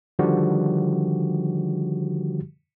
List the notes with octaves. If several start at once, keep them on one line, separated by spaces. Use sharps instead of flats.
D3 D#3 F3 G3 F#4 G4